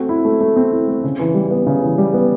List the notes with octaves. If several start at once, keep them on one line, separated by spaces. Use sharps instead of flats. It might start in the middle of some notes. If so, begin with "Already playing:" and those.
Already playing: A3 C4 F#4
E4
A3
A3
C4
E4
A3
C#3
E3
G3
B3
C#3
E3
G3
B3